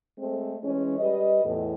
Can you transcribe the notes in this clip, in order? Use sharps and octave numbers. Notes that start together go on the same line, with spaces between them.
G#3 A3 C4
E3 G#3 C#4
G3 B4 D#5
E2 A2